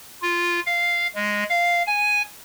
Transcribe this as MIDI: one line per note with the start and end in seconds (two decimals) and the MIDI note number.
0.22 0.60 65
0.66 1.07 77
1.15 1.44 56
1.50 1.83 77
1.87 2.22 80